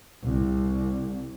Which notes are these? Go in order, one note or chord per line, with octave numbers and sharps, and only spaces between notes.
C2